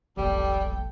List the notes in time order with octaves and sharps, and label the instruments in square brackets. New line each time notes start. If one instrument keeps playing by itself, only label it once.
[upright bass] E1 A#3 [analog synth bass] A#1 [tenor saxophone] G3 [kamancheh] A4 G5